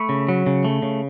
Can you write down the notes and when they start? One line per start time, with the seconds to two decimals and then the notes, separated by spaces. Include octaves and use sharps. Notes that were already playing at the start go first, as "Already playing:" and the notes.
Already playing: A3 B5 C#6
0.09 C#3
0.29 F#3
0.46 C#3
0.65 A3
0.82 C#3